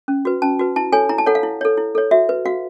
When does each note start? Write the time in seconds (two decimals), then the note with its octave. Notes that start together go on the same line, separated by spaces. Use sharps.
0.08 C#4
0.25 F#4 B4
0.42 C#4 A5
0.59 F#4 B4
0.76 E4 A5
0.92 A4 C#5 G#5
1.09 E4 A#5
1.18 A5
1.26 A4 C#5 F#5
1.35 F5
1.43 E4
1.61 A4 C#5
1.77 E4
1.95 A4 C#5
2.11 F#4 E5
2.29 B4
2.46 F#4 F5